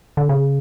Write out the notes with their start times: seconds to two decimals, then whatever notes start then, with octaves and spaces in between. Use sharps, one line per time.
0.17 D3
0.29 C#3